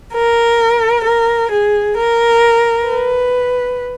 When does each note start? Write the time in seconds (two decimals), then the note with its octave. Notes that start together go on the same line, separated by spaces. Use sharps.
0.12 A#4
1.04 A#4
1.49 G#4
1.96 A#4
2.87 B4